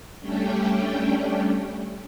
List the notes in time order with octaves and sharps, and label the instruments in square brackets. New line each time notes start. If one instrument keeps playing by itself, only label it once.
[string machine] G3 A3 C#4 D4 G5